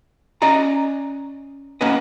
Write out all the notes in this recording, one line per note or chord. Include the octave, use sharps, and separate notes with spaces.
C#4 D5 D#5 A#5
A#3 C#4 F#4 B4 D#5